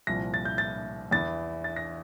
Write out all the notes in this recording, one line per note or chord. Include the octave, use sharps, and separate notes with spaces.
C2 A#2 F3 A#6
A6
G6
A6
E2 E3 A6
A6
A#6